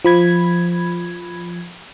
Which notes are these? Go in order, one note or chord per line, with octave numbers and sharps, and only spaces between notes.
F3 B5 G#6